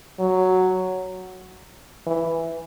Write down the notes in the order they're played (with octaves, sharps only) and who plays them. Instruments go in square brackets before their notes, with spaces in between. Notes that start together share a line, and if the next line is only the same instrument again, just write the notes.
[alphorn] F#3
E3